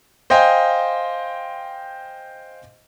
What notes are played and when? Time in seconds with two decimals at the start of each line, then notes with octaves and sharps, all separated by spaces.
0.30 C5 D#5 F5 G5 G#5